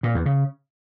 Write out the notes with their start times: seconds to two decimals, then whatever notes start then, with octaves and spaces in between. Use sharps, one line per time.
0.03 A#2
0.14 E2
0.26 C#3